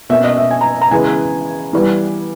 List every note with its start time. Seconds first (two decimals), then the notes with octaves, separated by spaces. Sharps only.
0.09 B2 A#3 C#4 E5
0.24 D#5
0.37 E5
0.51 G#5
0.61 A#5
0.81 A#5
0.91 C#3 E3 G#3 B3 G#5
1.73 E3 G3 B3